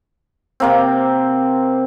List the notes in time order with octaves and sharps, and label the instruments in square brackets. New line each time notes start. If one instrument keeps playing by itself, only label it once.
[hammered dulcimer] C3 A#3 C4